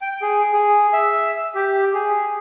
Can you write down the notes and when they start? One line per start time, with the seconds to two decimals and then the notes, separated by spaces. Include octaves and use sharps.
0.01 G5
0.22 G#4
0.53 G#4
0.93 E5
1.55 G4
1.94 G#4